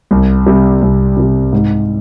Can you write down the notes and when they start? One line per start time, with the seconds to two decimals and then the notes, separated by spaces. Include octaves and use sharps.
0.11 C2
0.46 C3 G3
0.82 C2
1.17 C3 G3
1.53 G#2